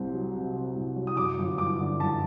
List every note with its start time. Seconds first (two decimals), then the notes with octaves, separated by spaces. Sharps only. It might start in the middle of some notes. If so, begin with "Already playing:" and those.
Already playing: C2 C3 C4
0.13 F#3
0.34 C3
0.54 C4
0.76 C2
0.96 F#3
1.07 D#6
1.17 F#2 D6
1.38 G1
1.58 G1 D6
1.79 D3
2.00 F#2 A5